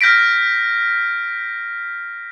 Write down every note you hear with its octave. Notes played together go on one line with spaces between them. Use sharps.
F6 G6 A#6 B6 D7